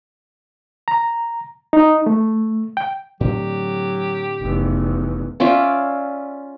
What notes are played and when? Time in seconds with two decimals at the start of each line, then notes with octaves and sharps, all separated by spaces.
0.88 A#5
1.73 D#4
2.06 A3
2.77 G5
3.20 A2 D3 F#3 C4 G4
4.42 F1 E2
5.40 C#4 F4 D5 E5